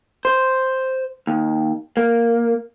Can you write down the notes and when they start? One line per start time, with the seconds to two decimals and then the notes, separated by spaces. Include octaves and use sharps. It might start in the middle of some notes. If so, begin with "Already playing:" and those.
0.25 C5
1.27 D#2
1.97 A#3